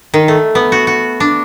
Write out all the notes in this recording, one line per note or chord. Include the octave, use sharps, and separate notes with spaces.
D#3
A3
B3
F#4
F#4
D4